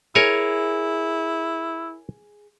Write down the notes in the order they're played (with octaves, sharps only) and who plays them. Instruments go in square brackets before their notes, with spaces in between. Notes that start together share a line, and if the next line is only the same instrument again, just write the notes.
[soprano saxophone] E4 [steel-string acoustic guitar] G#4 [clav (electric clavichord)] A#4 C#5 G#5